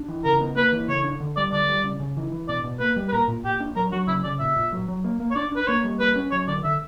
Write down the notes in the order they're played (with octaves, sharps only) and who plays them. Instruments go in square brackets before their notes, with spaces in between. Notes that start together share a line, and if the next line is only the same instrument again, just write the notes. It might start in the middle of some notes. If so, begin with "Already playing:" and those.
Already playing: [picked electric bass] D4
E3
[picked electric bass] C#3 [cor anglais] A#4
[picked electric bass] B3
[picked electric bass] A#3 [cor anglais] B4
[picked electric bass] E3
[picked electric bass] C#3 [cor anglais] C#5
[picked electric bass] D4
D3
[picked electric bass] G3 [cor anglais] D5
[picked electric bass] D3 [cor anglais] D5
[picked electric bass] G3
C#3
C#3
E3
E3
[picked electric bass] B2 [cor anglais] D5
[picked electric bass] B2
[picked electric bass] A#3 [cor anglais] B4
[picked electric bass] G3
[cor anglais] B4
[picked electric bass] A#2 [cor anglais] A#4
[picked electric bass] A#2
[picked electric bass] A#2 [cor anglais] G4
[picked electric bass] D4
[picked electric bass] F#3 [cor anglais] A#4
[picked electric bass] F#3 [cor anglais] F#4
[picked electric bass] C#3 [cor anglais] E4
[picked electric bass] C#3 [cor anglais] D5
[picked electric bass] A#2 [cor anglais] E5
[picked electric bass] A#2
F#3
F#3
A#3
A#3
[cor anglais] C#5
[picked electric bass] D4 [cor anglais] D5
[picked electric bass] D4 [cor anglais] B4
[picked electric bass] A#3 [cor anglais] C#5
[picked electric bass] G3
[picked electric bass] A#3 [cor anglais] B4
[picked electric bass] C#4
[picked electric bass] F#3 [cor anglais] C#5
[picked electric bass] D3 [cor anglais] D5
[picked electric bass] D3 [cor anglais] E5